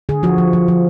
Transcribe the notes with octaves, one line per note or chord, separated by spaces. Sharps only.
D3 G#4
F3 F#4
F3
F3
F3